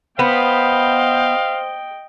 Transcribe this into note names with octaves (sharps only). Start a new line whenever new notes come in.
B3 C5 D#5 F5 G5